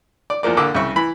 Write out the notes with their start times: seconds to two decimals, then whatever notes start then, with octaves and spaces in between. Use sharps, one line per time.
0.30 D5
0.43 E2 F3 A#3 D5
0.57 A#1 D3 A#3 D6 E6
0.75 C2 C#3 E5 C#6
0.96 E3 B5